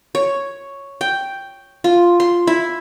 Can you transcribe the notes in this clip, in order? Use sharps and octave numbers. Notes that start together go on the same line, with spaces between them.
C#5
G5
F4
C6
E4